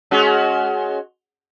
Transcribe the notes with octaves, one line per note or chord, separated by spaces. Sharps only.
G#3 C#4 F#4